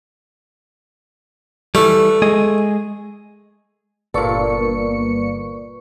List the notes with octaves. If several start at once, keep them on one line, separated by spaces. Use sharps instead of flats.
E3 G3 A3
G#3 G#4 D#5
G1 A#2 A#3 A4 B4 D5 C#6 C#7